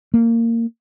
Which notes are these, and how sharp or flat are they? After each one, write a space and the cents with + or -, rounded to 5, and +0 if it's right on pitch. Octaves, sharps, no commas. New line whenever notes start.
A#3 -20